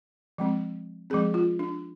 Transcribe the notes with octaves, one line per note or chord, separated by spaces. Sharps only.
F3 G#3 C4
F3 G#3 C4 G#4
F4
D4